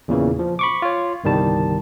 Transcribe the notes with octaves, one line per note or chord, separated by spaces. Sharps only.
E2 A#2 C#3 E3
F3
B5 C#6 D6
F4 C#5
G1 C2 D#3 G3 A5